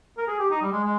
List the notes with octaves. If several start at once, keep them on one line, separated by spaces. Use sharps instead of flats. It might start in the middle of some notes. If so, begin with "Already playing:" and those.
A#4
G#4
G4
D#4
G3
G#3
G#3